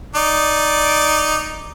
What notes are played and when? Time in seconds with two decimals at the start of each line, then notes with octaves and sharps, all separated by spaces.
0.15 D#4 D5